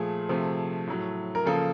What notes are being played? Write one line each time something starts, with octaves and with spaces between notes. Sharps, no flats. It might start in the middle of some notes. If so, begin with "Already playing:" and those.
Already playing: A#2 F3 A3 G#4
C3 F3 A3
A2 F#3 A3
A#4
C#3 F3 A#3 A4